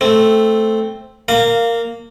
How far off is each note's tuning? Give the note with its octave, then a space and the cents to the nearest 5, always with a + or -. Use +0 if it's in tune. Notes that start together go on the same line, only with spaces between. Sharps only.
A3 +0 C4 +0
A#3 -10 F5 +0 A#5 -35